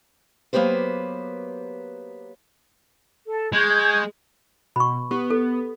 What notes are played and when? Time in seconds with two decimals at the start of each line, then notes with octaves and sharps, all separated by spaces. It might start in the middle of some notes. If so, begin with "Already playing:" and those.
0.53 F#3 A#3 B3 G4 B4 C5
3.28 A4
3.53 G#3 C#6 G6 G#6
4.76 B2 B5 C#6
5.11 B3 G4
5.30 A4